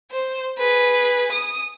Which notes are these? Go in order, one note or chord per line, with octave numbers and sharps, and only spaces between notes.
C5
G#4 B4
D#6